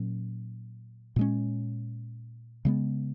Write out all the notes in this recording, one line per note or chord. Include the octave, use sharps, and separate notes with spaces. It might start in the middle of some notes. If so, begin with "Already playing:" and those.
Already playing: A#2 F#3 C#4
A#2 G#3 C#4
C#3 G#3 B3